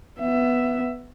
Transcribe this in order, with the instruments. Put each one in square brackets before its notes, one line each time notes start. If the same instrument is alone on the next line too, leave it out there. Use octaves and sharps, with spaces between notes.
[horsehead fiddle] B3 E5